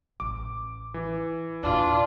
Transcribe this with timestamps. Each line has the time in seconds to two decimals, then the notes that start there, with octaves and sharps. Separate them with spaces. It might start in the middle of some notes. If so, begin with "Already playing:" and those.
0.20 A1 C#4 D6
0.94 E3
1.63 D#2 A#2 D4 F4